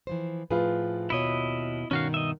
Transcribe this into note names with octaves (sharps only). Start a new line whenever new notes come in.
E3 F3 C5
A2 F3 F4 G#4 B4
D#2 B2 E4 C#5 D#5
G2 B2 D#3 C#4 F#4 F5
D#5 E5